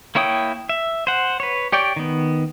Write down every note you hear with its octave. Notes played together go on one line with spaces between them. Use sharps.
A#3 E4 C#5 G5 D#6
E5
C5 F#5
B4 C#5
G4 C#5 D5 G5
D#3 B3